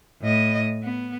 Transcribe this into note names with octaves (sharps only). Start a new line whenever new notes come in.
A2 D#5
B3